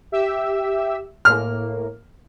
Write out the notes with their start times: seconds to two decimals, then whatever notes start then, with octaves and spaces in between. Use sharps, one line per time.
0.12 G4 E5 E6
1.25 A2 A#3 F6